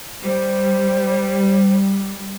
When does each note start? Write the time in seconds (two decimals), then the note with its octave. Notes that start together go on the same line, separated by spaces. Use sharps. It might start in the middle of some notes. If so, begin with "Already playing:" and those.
0.24 G3 C5